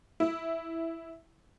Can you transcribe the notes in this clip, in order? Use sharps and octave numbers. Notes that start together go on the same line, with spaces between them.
E4